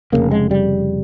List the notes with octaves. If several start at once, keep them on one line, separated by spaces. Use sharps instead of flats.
F1 D#2 C#3 A#3
G#3
G3